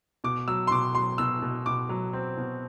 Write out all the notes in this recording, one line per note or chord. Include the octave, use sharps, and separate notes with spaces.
B2 D6
F#3 E6
C6
B2 D6
F#3 C6
B2 E6
B2
B2 D6
F#3
C4
B2